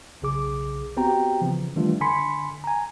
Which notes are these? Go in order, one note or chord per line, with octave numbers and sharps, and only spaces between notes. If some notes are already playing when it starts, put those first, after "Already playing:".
B1 C#3 G#4 D6
B3 C4 F#4 G4 G5 A#5
C#3 E3 F3
D#3 E3 G3 A3 D4 F4
D3 G#5 B5 C6 B6 C#7
G#5 A#5